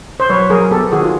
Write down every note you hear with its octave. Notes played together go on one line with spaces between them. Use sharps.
C5
F#3 B4 C#5
F#3 G#4 A#4
B3 G4 A4
D#3 F#4 G#4
F4